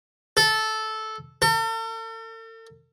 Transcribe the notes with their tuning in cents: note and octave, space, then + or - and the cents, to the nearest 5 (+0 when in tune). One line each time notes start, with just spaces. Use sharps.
A4 -10
A4 +45